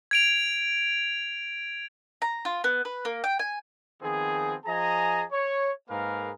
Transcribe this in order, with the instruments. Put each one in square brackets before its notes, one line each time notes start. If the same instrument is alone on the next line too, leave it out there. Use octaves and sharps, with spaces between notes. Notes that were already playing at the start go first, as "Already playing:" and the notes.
[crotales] G#6 D7 F7
[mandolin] A#5
F4
B3
B4
A#3
G5
G#5
[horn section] D#3 F3 B3 C4 G#4
F3 G#4 D#5 G#5 A#5
C#5
G#2 A#3 G#4 A#4 B4 F5